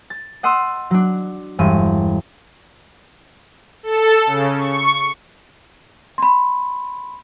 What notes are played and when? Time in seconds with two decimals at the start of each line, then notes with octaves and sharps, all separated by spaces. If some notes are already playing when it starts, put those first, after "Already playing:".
0.10 A6
0.43 D#5 F#5 C6 D#6 E6
0.91 F#3 D4
1.59 E1 G2 D#7
3.83 A4
4.26 C#3
4.58 C#6
6.18 B5 C6